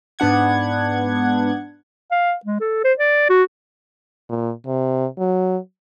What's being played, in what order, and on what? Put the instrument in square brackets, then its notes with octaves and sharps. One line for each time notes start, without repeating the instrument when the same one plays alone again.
[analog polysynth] G#2 B3 D4 F#5 G#6
[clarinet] F5
G#3
A4
C5
D5
F#4
[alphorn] A#2
C3
F#3